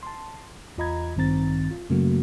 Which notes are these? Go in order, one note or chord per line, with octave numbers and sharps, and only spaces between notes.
A5 C6
E2 F4 D#5 A#5 B5 G#6
A1 G2 D#3 C4 A#5 A6
F4
F#2 C#3 F#3 A3 A#3 F#4